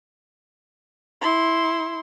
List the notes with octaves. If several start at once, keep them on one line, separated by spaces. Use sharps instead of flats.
E4 C6